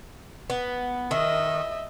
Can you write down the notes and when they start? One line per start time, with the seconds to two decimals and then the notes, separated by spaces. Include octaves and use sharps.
0.50 B3
1.11 D#3 D#5 E5